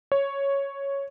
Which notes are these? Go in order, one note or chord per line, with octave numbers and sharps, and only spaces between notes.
C#5